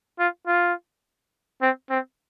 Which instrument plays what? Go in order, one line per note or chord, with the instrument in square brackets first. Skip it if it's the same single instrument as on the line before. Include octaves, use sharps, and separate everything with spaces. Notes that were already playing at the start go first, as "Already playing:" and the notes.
[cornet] F4
F4
C4
C4